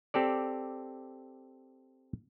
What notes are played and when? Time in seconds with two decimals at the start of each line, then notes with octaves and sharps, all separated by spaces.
0.14 C4 G4 A4 D5